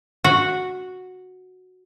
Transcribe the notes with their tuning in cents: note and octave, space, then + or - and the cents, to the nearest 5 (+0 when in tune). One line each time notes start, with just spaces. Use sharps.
F#4 -5